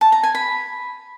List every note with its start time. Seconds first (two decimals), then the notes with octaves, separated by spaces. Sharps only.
0.01 A5
0.12 A#5
0.23 G#5
0.35 B5